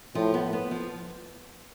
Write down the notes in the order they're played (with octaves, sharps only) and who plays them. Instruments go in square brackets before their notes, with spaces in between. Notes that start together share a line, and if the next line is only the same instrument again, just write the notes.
[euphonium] A2 [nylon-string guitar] F3
[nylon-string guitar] B3
B3
F3